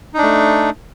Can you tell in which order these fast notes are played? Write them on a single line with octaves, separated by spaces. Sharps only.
D#4 D4 A3